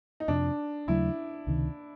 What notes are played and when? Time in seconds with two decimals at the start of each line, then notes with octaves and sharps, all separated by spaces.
0.20 D#4
0.28 F2 C3 F3 D4
0.88 D#2 C#3 F#3 A3 E4
1.47 C#2 C3 D#3